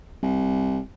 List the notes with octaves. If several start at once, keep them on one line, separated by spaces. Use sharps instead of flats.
C2